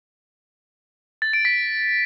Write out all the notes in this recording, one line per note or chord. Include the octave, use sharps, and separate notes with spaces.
A6
D7
B6